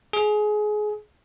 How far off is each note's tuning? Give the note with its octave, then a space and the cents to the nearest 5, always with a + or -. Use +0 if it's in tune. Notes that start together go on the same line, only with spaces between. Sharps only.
G#4 +25